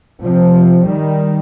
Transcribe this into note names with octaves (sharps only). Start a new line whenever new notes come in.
C3 F3
D#3 G3